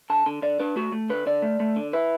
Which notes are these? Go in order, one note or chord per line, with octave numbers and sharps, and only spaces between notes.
D3 A5
D3
D3 D5
D4 B4
A3 F#4
A3
D3 B4
D3 D5
A3
A3
D3
E4 B4